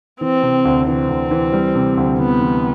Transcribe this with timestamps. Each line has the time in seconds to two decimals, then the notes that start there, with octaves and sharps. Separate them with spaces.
0.21 E3 C4
0.43 C3
0.65 D2
0.87 E3 C4
1.09 D2
1.31 E3
1.53 G3
1.75 C3
1.97 D2
2.19 E3 B3
2.41 E3